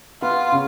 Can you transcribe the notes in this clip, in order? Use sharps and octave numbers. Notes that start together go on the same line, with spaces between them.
B3 F4
C#3